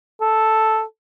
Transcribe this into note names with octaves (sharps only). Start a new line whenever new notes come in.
A4